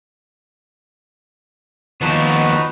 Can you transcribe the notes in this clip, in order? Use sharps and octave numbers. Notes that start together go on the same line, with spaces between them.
D#2 F3 B3 D#4 F#4 B4